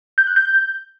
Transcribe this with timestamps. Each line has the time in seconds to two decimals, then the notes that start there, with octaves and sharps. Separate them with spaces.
0.18 G6
0.27 F#6
0.36 G6